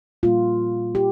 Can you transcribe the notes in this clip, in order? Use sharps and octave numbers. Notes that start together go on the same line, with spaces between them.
A#2 G3 A#3 F4
G4